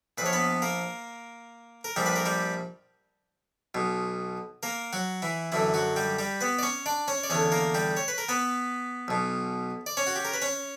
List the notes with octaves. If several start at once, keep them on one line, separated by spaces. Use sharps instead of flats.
A#1 A#2 B4 C#5
B3 B4
A#3 A#4
A#4
A#1 A#2 G3 G4
B4
A#4
G3 G4
B1 B2
A#3 A#4
F#3 F#4
E3 E4
F#2 D3 E3 E4
F#3 F#4
G3 G4
G3 G4
B3 B4
D5
C#4 C#5
D4 D5
C#4 C#5
D5
E2 D3 C#4 C#5
A#3 A#4
G3 G4
C#5
B4
A#4
B3 B4
B1 B2
D5
C#4 C#5
F#4
G4
A#4
B4
C#4 C#5